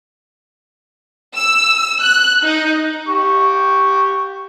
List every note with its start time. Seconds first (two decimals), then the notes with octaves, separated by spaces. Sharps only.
1.36 E6
2.02 F#6
2.44 D#4
3.08 G4 C#6